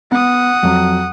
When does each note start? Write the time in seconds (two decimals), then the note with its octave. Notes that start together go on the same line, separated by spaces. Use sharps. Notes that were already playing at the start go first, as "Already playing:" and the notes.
0.12 B3 F#5 D#6
0.63 F2 F#3